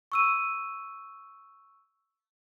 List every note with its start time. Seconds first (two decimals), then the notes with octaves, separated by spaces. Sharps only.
0.12 C#6 E6 D#7